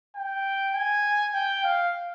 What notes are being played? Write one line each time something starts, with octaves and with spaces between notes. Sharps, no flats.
G5
G#5
G5
F5